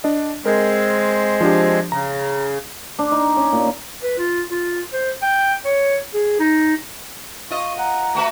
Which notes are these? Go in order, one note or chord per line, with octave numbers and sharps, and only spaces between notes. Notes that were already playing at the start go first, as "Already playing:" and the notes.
D4 D#5
G#3 C4 A#4
F3 D4 G4
C#3 A#5
D4
D#4
C#4
A#2
B4
F4
F4
C5
G5
C#5
G#4
D#4
F4 D#5 C#6
F#5 A#5
A3 F#4 B4